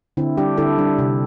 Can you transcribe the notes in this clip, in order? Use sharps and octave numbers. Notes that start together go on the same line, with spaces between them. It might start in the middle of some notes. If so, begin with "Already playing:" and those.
D3 C4 E4
G3 D4 G4
D3 E4 A4
G3 D4
C3